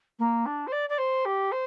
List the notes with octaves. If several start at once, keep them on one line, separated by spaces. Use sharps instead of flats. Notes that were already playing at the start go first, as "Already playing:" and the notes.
A#3
D4
C5
D5
D5
C5
G4
C5